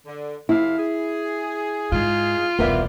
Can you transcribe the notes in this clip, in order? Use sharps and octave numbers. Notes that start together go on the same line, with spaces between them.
D3
F2 C3 E4 F5
G#4
G#2 D#4 F4 G#4
E1 C2 E3 F3 B3 A#4 D5 E5